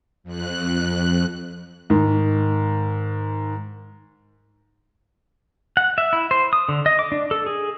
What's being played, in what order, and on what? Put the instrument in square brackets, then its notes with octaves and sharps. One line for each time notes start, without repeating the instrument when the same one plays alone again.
[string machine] F2 F#6
[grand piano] G#2 D#3
[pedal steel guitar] F#5
E5
E4
C5
D#6
D3
D#5
D6
D4
A4
G#4